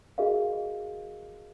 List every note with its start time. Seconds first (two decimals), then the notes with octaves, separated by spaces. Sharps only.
0.18 F#4 G#4 A#4 D#5 F5